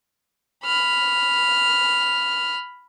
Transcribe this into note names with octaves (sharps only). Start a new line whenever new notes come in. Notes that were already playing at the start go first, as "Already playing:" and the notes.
B5 F6